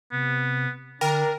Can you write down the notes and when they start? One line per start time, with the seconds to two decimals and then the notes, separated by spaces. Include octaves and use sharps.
0.12 C3 B3
1.01 D3 D4 A#4 G5